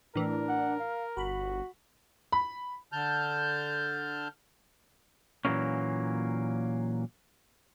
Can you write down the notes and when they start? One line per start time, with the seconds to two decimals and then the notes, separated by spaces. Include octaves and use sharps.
0.15 A2 E3 D4 A#4
0.49 F#5
0.80 F5
1.17 G1 F#4 B5
2.32 B5
2.92 D3 A5 F6 G6
5.45 A#2 E3 F#3 G#3 A#3 C#4